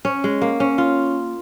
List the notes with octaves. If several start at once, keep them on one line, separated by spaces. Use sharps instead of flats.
C#4
G#3
A#3
C#4
F4